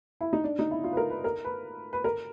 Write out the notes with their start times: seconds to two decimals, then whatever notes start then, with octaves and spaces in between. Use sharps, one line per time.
0.21 E4
0.33 D#4
0.44 D4
0.59 D#4
0.71 E4
0.84 F4
0.93 B4
0.97 A#4
1.10 B4
1.24 A#4
1.44 B4
1.93 B4
2.04 A#4